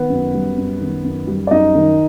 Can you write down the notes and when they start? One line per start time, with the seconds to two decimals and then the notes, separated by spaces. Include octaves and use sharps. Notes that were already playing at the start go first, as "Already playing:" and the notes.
Already playing: D#3 B3 B4
0.10 F#2
0.34 G3
0.58 F#2
0.81 D#3
1.04 F#2
1.27 G3
1.47 D5
1.51 F#2 D#4 D#5
1.75 D#3